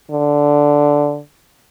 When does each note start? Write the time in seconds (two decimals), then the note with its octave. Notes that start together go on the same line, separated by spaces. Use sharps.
0.11 D3